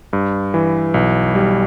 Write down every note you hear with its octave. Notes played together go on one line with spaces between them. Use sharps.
G2
E3
B1
G3